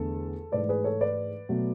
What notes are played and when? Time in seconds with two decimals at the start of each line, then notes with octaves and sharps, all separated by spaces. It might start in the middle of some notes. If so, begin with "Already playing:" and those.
Already playing: E2 D3 A3 A4
0.52 G#2 E3 A3 B4 D5
0.69 G#4 B4
0.84 A4 C#5
1.00 B4 D5
1.49 B2 F#3 A3